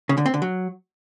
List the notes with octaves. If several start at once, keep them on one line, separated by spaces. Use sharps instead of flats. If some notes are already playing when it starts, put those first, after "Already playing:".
C#3
D3
C4
D3
F#3